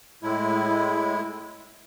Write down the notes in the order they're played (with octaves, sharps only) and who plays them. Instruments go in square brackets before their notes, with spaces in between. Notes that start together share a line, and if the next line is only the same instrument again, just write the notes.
[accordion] A2 G#3 E4